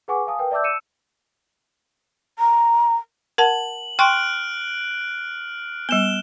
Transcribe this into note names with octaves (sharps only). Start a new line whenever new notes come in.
G#4 B4 F#5 G#5 C#6 D6
F5 G#5 A5 D#6
A#4 B4 G5
D5 E5 A5 D6 E6 G6
E6 C#7 D#7 E7
A#5
A#4 F#5 A5 F#7
G5 C6 C#6 F6 F#6 D7
G3 B3 E7 G7